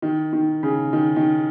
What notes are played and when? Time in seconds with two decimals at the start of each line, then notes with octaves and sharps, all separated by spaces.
0.02 D#3
0.33 D#3
0.63 C#3
0.93 D#3
1.16 D#3